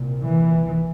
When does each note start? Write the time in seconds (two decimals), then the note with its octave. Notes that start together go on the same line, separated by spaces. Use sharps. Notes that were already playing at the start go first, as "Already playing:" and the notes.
Already playing: C2 A#2
0.21 E3